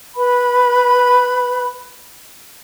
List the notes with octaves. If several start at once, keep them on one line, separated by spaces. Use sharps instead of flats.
B4 B5